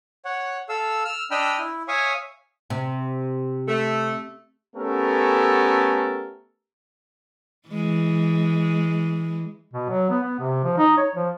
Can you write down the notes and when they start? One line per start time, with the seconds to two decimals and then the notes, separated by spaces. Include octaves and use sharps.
0.25 C#5 F#5
0.69 A4 F5 E6
1.05 E6 F6
1.31 D4 D#5 G5 B5 E6 F6
1.59 E4
1.88 C#5 E5 F5 G#5 C#6 D#6
2.70 C3
3.67 A3
4.76 A3 B3 C#4 G4 A4 A#4
7.69 E3 G#3
9.73 B2
9.89 F#3
10.10 B3
10.23 B3
10.40 C3
10.64 F3
10.78 D#4
10.97 C#5
11.16 F3